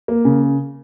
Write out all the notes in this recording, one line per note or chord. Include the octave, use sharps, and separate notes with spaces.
A#3
C#3